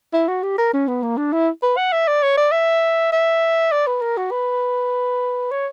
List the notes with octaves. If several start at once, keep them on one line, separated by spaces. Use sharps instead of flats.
E4
F#4
G4
A#4
C#4
B3
A#3
D4
E4
B4
F#5
E5
D5
C#5
D5
E5
E5
D5
B4
A#4
F#4
B4
C#5